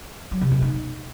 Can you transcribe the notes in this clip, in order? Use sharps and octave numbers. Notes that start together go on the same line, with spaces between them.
F#3
C3
B2
D#4